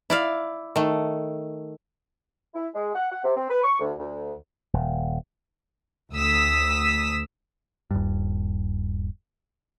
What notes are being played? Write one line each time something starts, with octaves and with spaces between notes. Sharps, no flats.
E4 D5 F5
D#3 A3
E4
G#3
F#5
F#5
C3
C4
B4
C#6
D2
D2
D#1
D2 D#6 E6 B6
D#1 G2